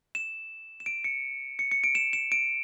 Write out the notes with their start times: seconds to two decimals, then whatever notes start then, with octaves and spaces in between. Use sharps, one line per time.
0.15 E7
0.80 E7
0.86 D7
1.04 C#7
1.59 C#7
1.72 C#7
1.84 D7
1.95 E7
2.13 E7
2.32 D7